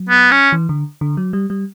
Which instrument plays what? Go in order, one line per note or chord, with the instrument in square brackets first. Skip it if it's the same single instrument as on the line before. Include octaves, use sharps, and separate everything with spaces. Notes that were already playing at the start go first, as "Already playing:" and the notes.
Already playing: [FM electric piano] F#3
[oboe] B3
C#4
[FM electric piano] E3
D3
D3
F#3
G3
G3